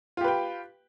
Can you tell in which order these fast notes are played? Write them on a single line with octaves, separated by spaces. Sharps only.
F4 G4 B4 G5